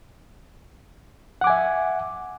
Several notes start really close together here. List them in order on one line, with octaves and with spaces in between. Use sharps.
F#5 D6 G#5 E5